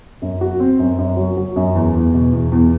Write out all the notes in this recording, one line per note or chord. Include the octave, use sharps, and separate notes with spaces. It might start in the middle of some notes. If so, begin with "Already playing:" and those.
F#2
F#4
C4
F#2
F#2
F#3
F#3
F#2
E2
E2
B2
E2
E2